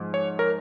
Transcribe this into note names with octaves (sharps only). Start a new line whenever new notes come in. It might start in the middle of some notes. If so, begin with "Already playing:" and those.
Already playing: G#2 F3 G#3
C#5
A#4 C#5